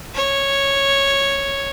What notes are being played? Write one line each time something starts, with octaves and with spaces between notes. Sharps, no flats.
C#5